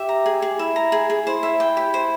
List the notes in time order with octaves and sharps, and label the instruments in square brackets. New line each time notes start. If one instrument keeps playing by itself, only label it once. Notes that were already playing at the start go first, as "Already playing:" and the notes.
Already playing: [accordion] G4 [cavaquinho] E5
[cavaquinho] A#5
G#4
G#4
[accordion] E4 [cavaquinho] E5
[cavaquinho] A#5
G#4
G#4
[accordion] E4 [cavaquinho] C5
[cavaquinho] E5
G5
G4
C5